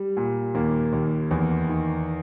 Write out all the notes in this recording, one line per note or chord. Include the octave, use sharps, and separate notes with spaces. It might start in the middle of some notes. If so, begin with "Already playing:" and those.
Already playing: G3
A#2
D#2 A#3
D#2
E2
D#3